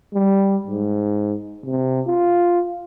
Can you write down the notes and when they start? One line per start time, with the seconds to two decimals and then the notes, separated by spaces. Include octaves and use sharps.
0.14 G3
0.67 G#2
1.65 C3
2.06 F4